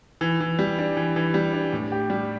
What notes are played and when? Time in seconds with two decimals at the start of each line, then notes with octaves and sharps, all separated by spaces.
0.21 E3
0.40 E3
0.59 G3
0.79 D4
0.97 E3
1.16 E3
1.34 G3
1.53 D4
1.73 A2
1.92 G4
2.10 G3